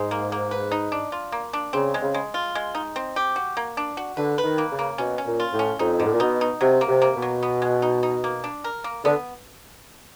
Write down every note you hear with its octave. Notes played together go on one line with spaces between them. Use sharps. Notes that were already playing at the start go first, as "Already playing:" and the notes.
Already playing: G#2 G#3
A#3
A#3
B4
D#4
D4
F4
A#3
D4
C#3 C4
G#3
C#3
G#3
F4
G#3
D#4
C4
G4
F#4
A#3
D4
F#4
D3 B4
B4
D#3
A#3
C#3
A#3
B2 C#4
C#4
A#2
F4
A2
C#4
F2 D#4
G#2 D3
A2
A#2
B2 D#4
D#4
C3 F#3
A#3
C3
A#3
B2
F#3
B3
G#3
D#4
D#4
A#3
D4
A#4
A#3
D3 B3